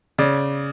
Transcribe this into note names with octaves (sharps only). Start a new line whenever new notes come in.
C#3 D5